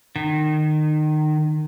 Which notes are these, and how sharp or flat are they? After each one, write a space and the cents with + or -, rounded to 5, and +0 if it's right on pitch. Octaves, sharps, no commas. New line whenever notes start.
D#3 -25